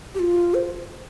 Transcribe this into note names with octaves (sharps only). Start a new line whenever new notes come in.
G4
F4
C5